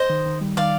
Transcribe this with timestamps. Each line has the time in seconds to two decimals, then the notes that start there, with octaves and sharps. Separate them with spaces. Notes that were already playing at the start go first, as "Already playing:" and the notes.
Already playing: C5 D#5
0.10 D#3
0.26 D#3
0.41 G3
0.57 D#3 D5 F5